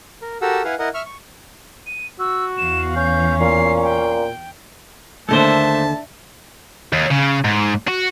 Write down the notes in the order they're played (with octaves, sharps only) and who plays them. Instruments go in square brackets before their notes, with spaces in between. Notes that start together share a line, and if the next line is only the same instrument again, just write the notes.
[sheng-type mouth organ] A#4
F#4 G4 A4 A#4 F#5 E6
E4 B4 F5 F#5 G#5
E4 A#4 D#5 F#5
E5 C#6 F6
C#6
[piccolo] D#7
[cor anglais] F#4 [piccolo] E6
[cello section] E2 F5 [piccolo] E7
[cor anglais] C#4 [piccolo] G6
[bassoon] A#2 [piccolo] C7
[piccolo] G5
[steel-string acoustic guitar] D#2 D3 [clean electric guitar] A3 A#3 C5 [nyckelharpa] D4 E5 [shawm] A5
[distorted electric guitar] D#2
C#3
G#2
F#4